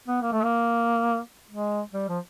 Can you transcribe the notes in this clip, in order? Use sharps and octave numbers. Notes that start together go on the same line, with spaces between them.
B3
A#3
A3
A#3
G#3
G3
F3